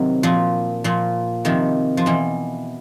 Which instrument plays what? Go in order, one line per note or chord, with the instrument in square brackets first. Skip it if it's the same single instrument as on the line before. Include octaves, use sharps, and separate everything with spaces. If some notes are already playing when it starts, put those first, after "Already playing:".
Already playing: [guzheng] C3 D#3 F#3
A#2 F3
A#2 F3
C3 D#3 F3
F3
B2 E3